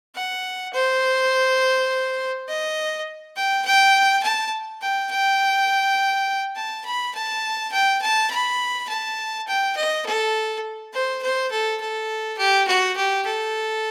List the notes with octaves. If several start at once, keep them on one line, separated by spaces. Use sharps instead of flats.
F#5
C5
D#5
G5
G5
A5
G5
G5
A5
B5
A5
G5
A5
B5
A5
G5
D#5
A4
C5
C5
A4
A4
G4
F#4
G4
A4